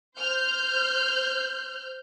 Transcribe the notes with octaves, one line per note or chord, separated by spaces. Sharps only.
C5 F6 G6